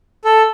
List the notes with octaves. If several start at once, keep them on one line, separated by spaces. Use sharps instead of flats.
A4